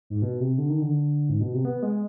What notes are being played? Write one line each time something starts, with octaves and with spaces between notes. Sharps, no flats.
G#2
B2
C3
D3
D#3
D3
G#2
B2
C3
B3
G#3